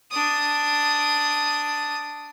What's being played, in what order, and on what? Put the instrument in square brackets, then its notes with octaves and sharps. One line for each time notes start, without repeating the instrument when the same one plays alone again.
[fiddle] D4 D#6